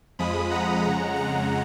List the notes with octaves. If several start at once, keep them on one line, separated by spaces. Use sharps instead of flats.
F2 F3 G#3 B5 D#6
F#5 A#5
F2 C#3 G#3 F#5 A#5
F#5 A#5